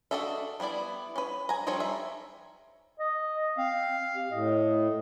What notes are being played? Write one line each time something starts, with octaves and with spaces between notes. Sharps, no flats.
D4 F#4 A4 D#5 E5
G3 B3 E4 D5
C#4 B4
G#5 A#5
F3 G3 D#4 A4 C#5
E5
D#5
C4 F5
G4
A2 D#5